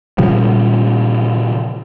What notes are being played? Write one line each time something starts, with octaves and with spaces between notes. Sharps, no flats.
A#2 C#3 F3 G3